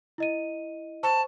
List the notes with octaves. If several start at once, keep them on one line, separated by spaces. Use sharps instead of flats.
E4 D#5 D#7
C5 A5 C#6